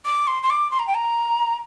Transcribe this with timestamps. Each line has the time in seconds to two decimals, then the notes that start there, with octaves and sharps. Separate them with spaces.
0.05 D6
0.27 C6
0.43 C6
0.50 D6
0.71 C6
0.79 A#5
0.87 G5
0.95 A#5